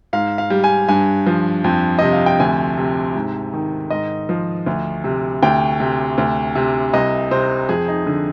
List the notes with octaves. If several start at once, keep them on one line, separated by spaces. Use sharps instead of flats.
G#2 F5
F5
G3
G#5
G2 G#5
F3
F2
C3 D#5
F5
G5
D2 G#5
C3
G#2
D#3
G#2 D#5
F3
D2
C3
D2 G5
C3
D2
C3
C2 D#5
C3 C5
F2 G#4
D#4
D3